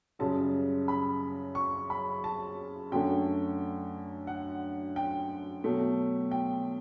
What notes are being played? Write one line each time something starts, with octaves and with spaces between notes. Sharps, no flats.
F#2 C#3 G3 A5
B5
C#6
B5
A5
F#2 D3 A3 G5
F#5
G5
B2 F#3 A3
G5